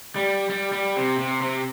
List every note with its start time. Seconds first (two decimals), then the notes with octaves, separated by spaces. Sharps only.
0.16 G3
0.49 G3
0.72 G3
0.96 C3
1.19 C3
1.42 C3